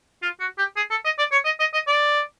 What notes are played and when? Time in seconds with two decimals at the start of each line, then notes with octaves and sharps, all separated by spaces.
0.22 F4
0.40 F#4
0.58 G4
0.77 G#4
0.91 A4
1.05 D#5
1.19 D5
1.32 C#5
1.45 D#5
1.60 D#5
1.74 D#5
1.87 D5